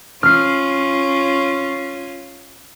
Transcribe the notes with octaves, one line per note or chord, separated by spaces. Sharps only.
C#4 F4 F6 C7